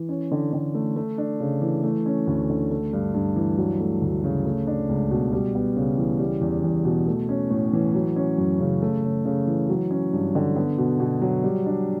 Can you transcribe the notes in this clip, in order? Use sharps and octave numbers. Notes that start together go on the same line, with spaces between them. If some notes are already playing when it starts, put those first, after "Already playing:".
Already playing: E3
C#4
D3
D3
A3
A3
D4
C#3
E3
A3
C#4
D2
D3
A3
G2
G2
E3
F#3
A3
D2
C#3
A3
D4
C#2
B2
G3
B3
C#3
E3
G3
E2
E2
B2
A3
C#4
A2
E3
F#3
C#4
F#2
C#3
A3
C#3
C#3
E3
F#3
C#4
G2
D3
B3
B2
B2
F#3
G3
D4